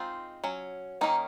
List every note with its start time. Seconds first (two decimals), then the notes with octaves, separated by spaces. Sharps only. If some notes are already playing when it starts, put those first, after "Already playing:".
Already playing: G#3 C4 D#4 F4
0.44 F#3 C#4
1.01 D#3 A#3 C#4 D#4